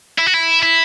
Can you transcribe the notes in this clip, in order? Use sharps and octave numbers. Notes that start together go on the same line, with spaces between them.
E4
F#4
E4
E4